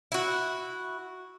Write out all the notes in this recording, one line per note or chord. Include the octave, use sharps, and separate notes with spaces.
E4 F#4